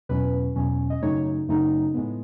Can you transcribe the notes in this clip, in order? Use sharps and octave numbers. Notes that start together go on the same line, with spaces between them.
E2 B2 F#3 C#4 B4
E2 B2 F#3 C#4
D#5
F#2 C#3 F#3 A3 D#4 C#5
F#2 C#3 F#3 A3 D#4
A2 G#3 B3